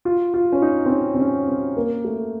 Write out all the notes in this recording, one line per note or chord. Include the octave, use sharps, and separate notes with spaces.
F4
F4
C#4
D#4
C4
C#4
C4
C#4
C4
A#3
A3